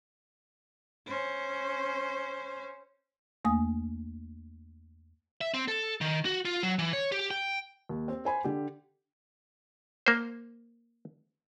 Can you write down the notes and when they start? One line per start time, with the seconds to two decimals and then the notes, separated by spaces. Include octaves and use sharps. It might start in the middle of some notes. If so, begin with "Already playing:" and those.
1.07 C#4 C5
3.45 E2 A3 A#3 G#5 D#6
5.41 E5
5.54 C4
5.68 A4
6.01 D#3
6.25 F#4
6.45 F4
6.63 F#3
6.79 E3
6.93 C#5
7.12 G4
7.31 G5
7.89 D#2
8.08 C4
8.25 C5 G#5 B5
8.44 D3 G4
10.07 A#3 C5